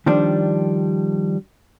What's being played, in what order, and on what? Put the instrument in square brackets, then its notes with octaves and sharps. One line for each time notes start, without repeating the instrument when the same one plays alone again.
[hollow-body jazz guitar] D#3 F3 G3 D4